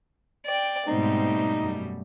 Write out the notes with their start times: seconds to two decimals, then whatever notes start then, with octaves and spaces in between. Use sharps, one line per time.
0.46 D5 G5
0.87 G#2 B2 G3 A3 C4 D#4
1.59 F#2